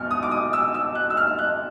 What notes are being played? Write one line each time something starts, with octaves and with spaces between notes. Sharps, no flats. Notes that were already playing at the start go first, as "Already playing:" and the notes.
Already playing: E2 B2 F#3 B3 F6
D#6
D6
D#6
E6
E6
F#6
E6
F6
F#6